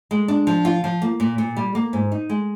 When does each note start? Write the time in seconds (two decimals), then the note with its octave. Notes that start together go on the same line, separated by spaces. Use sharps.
0.11 G#3
0.28 D4
0.47 F3
0.65 F4
0.84 F3
1.02 A#3
1.20 A#2
1.38 A#2
1.57 G3
1.75 A#3
1.93 G#2
2.12 D#4
2.29 G#3